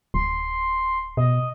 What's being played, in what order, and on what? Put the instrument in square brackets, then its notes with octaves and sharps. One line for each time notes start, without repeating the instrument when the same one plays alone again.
[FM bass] D1 [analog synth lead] C6
[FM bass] B2 [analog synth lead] D#5